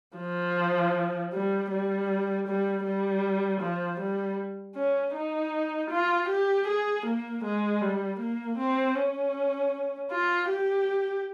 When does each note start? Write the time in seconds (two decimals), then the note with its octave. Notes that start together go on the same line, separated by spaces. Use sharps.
0.18 F3
1.33 G3
1.72 G3
2.48 G3
2.85 G3
3.61 F3
4.00 G3
4.76 C#4
5.15 D#4
5.91 F4
6.29 G4
6.68 G#4
7.06 A#3
7.45 G#3
7.82 G3
8.20 A#3
8.59 C4
8.96 C#4
10.12 F4
10.50 G4